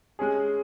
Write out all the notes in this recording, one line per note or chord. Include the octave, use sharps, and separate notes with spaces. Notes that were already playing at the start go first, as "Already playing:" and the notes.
G#3 C#4 G#4